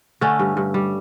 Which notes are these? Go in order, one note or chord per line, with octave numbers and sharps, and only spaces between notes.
D3 A3 C#4
G2
G2
G3